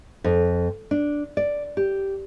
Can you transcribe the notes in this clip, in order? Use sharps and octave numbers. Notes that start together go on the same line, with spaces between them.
F2
D4
D5
G4